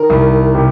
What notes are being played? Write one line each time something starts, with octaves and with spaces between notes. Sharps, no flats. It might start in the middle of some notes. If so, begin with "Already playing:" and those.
Already playing: D#3 A#4
C2
C3